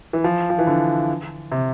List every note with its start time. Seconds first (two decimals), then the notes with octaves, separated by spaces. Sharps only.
0.13 E3
0.24 F3
0.50 F3
0.59 E3
0.67 D3
1.52 C3